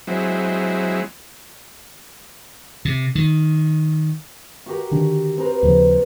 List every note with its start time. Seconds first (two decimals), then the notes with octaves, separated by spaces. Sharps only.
0.07 F#3 G#3 C4 E4
2.85 C3
3.15 D#3
4.66 F#4 G4 A#4
4.91 D3 D#3 D4
5.37 C4 A#4 B4
5.63 D#2 C#3 F3